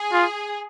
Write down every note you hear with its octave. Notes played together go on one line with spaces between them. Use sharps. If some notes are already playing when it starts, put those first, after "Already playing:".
Already playing: G#4
F4